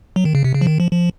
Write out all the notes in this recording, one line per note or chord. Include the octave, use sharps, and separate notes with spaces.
F#3
D#3
C#3
C3
C#3
F3
D#3
F3
F3